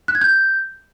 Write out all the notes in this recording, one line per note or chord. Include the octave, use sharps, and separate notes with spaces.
F#6
G#6
G6